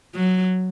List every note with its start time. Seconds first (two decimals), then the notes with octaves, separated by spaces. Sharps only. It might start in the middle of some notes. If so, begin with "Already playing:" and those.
0.15 F#3